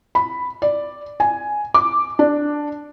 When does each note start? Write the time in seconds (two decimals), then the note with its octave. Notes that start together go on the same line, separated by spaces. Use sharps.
0.15 B5
0.62 D5
1.20 G#5
1.74 D6
2.19 D4